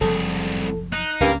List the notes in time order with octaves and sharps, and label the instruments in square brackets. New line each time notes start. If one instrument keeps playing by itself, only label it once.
[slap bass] F#1 C3 F3 [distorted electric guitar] C2 G#4 [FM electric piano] A4
[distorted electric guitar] D#4 [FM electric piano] F#6
[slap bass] C#2 C#4 [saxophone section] G2 A#3